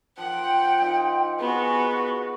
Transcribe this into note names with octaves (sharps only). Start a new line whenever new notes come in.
F3 F#5 G5
D#4 F4
B3 F#4 G#4